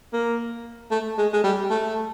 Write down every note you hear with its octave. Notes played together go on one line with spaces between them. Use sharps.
A#3
A3
G#3
G#3
G3
A3